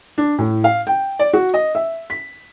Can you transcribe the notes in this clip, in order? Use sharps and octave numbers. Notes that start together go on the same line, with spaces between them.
D4
A2
F5
G5
D5
F#4
D#5
E5
B6